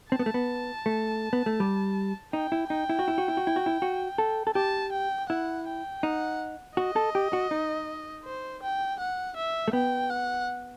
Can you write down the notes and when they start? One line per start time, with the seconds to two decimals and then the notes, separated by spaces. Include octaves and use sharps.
0.11 C4 A5
0.19 B3
0.26 A3
0.34 B3
0.86 A3
1.33 B3
1.46 A3
1.60 G3
2.33 D#4 G5
2.52 E4
2.70 D#4 G5
2.89 E4
2.99 F#4
3.08 E4
3.18 F#4
3.28 E4
3.37 F#4
3.47 E4
3.56 F#4
3.66 E4
3.82 F#4
4.18 A4
4.47 A4
4.55 G4 A5
4.92 G5
5.29 E4 F#5
5.67 G5
6.03 D#4 F#5
6.77 F#4 D#5
6.96 A4
7.15 G4
7.33 F#4
7.51 D#4
8.25 C5
8.63 G5
9.00 F#5
9.37 E5
9.68 A3
9.73 B3 G5
10.10 F#5